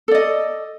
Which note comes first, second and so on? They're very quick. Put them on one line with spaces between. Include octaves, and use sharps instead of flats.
A4 D5 D#5